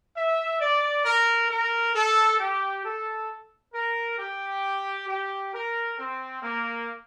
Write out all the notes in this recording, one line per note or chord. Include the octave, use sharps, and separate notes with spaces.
E5
D5
A#4
A#4
A4
G4
A4
A#4
G4
G4
A#4
C4
A#3